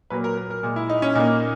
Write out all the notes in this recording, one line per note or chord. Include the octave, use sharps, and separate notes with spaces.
A#2 F#3 A#3 B4
A#4
A#4
A#4
A#2 G#3
E4
D#4
C#4
A#2 A#3 D#4